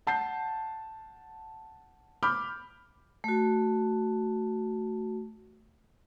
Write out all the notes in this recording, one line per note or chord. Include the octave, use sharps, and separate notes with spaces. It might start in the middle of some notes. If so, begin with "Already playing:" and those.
F#5 A5 G6 C7
B5 D6 F6 G6
A3 F#4